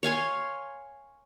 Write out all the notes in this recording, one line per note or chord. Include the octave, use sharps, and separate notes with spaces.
C#5 F5 G#5 C6